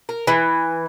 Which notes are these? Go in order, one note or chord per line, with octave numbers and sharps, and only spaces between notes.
A#4
E3